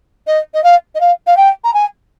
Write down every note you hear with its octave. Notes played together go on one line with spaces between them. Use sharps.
D#5
D#5
F5
D#5
F5
F5
G5
A#5
G#5